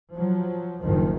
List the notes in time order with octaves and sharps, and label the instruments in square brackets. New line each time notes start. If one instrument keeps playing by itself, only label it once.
[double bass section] F3 F#3
F#1 D2 A2 D#3 F3